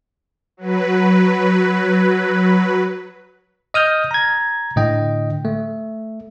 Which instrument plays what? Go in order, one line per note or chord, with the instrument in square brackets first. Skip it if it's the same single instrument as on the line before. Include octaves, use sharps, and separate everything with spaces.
[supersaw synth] F#3 B4
[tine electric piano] D#5 D#6 F6 G6
A#5 G#6
A2 D3 D#5 G5
A3